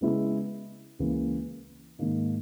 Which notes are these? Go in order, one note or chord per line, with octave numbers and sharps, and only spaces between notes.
C#3 G#3 B3 E4
C#2 C#3 E3 A#3
G#2 D#3 A#3 D#4